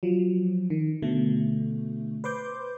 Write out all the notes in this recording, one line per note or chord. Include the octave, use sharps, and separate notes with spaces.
F3 F#3
D#3
B2 D3 A3
B4 C5 C6 D6 G6